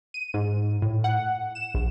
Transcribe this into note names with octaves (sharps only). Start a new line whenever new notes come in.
D#7
G#2
A2
F#5
E7
A#1